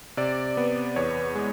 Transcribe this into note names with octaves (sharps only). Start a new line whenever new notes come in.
C3 D5
B3
E2 C#5
G#3